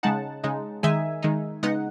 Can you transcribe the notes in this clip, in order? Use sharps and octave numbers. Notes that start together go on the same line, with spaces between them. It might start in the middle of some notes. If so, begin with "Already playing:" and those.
C#3 G#3 D#4 F#5 A5
C#3 G#3 D#4
D#3 G#3 D#4 E5 G#5
D#3 G#3 D#4
C#3 G#3 B3 D#4 D#5 F#5